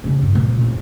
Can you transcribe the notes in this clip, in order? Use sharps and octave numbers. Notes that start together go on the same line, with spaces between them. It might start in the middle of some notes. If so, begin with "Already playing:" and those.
C#3 D4
G2
A#2
A1 F2